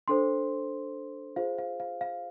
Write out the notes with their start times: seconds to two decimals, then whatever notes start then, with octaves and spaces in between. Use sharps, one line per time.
0.08 D4 A4 C5 C6
1.36 F4 G#4 C5 F5
1.58 F5
1.80 F5
2.01 F5